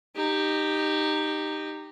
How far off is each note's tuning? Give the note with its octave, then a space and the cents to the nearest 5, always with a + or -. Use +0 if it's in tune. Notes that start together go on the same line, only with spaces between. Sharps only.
D#4 -15 G4 +0